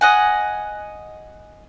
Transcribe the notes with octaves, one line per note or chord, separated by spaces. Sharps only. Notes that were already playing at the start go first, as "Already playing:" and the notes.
D#5 F#5 G#5